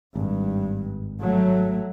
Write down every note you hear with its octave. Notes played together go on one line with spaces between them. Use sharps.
G#1 G2
F#3 A3